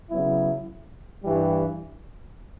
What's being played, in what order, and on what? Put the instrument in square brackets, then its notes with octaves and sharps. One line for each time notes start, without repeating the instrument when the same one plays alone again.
[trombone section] C#3 F#3 B3 E4
G2 E3 G3